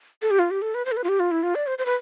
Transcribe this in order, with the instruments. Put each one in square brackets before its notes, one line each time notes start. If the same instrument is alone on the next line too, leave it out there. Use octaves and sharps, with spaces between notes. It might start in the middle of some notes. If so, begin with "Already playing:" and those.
[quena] A4
G4
F4
G4
A4
B4
C5
A4
B4
F4
G4
F4
E4
F4
D5
C5
C5
B4